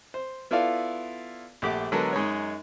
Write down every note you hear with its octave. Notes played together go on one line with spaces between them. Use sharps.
C5
B3 E4 F4 A4 D5 F5
A#1 A3 G4 F#5 D6
D3 F#3 G#3 B3 A4 A#4
F#2 G#3 D#4 C#5